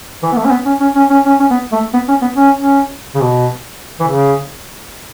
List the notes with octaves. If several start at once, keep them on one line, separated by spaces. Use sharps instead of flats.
E3
B3
A3
C#4
B3
C#4
C#4
C#4
C#4
C#4
C#4
B3
A3
B3
C#4
B3
C#4
C#4
C#3
B2
E3
C#3